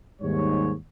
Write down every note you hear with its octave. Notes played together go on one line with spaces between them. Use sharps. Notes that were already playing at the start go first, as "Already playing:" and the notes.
D#2 G#2 G3 C#5